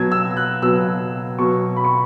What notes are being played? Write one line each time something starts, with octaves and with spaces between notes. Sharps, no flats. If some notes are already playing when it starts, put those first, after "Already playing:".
Already playing: B2 F#3 G#6
E6
F#6
B2 F#3 E6
B2 F#3 C#6
B5
C#6